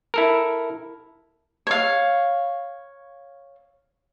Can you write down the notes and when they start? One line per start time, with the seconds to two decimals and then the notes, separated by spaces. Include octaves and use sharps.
0.14 E4 A4 A#4
1.67 C#5 F5